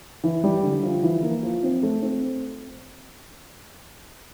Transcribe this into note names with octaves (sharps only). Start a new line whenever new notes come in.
E3
G3
D3
F3
E3
A#3
F3
C4
A3
C4